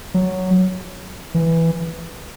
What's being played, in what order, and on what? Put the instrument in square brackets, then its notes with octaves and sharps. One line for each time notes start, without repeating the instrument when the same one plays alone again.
[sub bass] F#3
E3